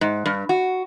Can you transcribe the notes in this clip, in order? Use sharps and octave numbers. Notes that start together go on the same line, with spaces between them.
G#2
G2
F#4